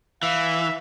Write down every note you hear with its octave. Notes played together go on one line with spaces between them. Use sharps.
E3 E5 F5